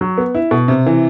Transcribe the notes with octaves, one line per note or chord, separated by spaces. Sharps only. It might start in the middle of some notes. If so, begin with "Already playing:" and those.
F#3
B3
E4
B2
C3
E3